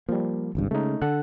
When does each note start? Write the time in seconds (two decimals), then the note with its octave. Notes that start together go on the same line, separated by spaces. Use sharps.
0.09 F3 G3 A#3
0.55 G#1 C#2 G2
0.71 C#3 G#3 A3 D#4
1.02 D3 A4 F#5 F#6